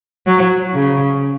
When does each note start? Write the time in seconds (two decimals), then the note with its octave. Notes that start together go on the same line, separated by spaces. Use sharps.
0.27 F#3
0.74 C#3